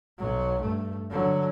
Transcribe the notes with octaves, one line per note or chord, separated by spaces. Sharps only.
B1 F#3
G2 A3
D3 F#3